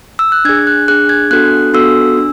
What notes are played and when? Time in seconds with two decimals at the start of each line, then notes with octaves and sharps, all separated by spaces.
0.19 E6
0.32 F#6
0.45 D4 G#4 G#6
0.67 F#6
0.88 D4 G#4 F#6
1.09 G#6
1.31 B3 D4 F#4 A4 F#6
1.74 B3 D4 F#4 A4 E6
2.17 D4